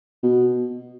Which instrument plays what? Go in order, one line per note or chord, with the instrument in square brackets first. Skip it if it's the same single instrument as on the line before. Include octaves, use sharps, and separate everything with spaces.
[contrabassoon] B2